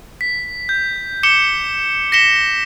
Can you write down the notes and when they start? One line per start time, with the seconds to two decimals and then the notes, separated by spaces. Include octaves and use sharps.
0.21 B6
0.69 G6
1.23 D6 C#7 E7 G7
2.12 A#6 B6 C#7 E7 G7